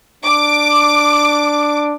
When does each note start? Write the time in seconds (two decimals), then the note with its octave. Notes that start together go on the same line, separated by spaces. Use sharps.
0.24 D4 D6